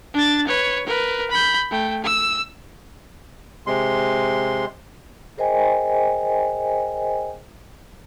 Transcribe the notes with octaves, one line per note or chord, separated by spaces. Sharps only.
D4 A6
B4 C#5
A#4 B4
B5 G6
A3 G5
E6
C3 G#3 C6
G#4 A#4 C5 D#5 G5 G#5